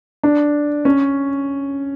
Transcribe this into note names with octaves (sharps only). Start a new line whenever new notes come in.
D4
C#4